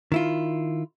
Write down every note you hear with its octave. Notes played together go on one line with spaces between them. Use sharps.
D#3 E4 F4